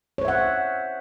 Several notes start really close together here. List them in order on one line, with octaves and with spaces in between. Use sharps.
C#5 C5 E5 F#5